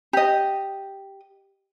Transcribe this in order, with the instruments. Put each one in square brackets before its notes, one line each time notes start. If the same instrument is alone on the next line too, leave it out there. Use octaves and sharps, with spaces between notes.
[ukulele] G4 D#5